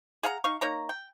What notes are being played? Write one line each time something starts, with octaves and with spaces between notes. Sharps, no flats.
G#4 F5 F#5 A#5
D#4 F5 C#6
A#3 D#4 C#5 A#5
G5